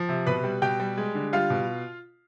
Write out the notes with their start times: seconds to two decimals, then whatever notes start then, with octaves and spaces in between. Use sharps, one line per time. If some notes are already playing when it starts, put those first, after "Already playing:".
Already playing: F3
0.09 C3
0.27 B2 B4 B5
0.44 G3
0.62 B2 G4 G5
0.80 G3
0.98 G#3
1.15 D3
1.33 G3 F4 F5
1.50 B2